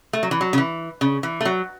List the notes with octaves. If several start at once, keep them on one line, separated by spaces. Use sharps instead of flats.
A3
F#3
E3
F#3
C#3
E3
C#3
E3
A3
F#3